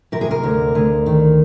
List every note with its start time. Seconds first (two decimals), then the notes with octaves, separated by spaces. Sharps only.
0.12 C3 A#4
0.21 G#4
0.31 A#4
0.43 D2
0.75 D2
1.06 D#3